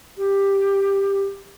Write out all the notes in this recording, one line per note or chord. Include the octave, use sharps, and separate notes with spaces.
G4